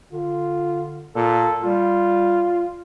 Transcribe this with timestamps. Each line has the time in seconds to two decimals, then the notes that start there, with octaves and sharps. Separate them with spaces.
0.13 D3 F4
1.16 A#2 A4
1.64 G3 F4